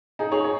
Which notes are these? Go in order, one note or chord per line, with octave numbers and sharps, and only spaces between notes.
D#4 G#4
G#4 C#5
C#5